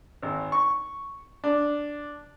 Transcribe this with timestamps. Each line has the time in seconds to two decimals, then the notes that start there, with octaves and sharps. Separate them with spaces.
0.23 G#1
0.52 C#6
1.44 D4